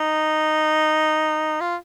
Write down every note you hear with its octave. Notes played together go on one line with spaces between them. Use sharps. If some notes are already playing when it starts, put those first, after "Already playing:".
Already playing: D#4
F4